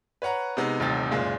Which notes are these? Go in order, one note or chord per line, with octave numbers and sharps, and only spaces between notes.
B4 C#5 F#5 A#5
C3 G#3 B3 D#4
D#1 A1 C3 D#4 G4 A6
F#1 A#2 G#3 F4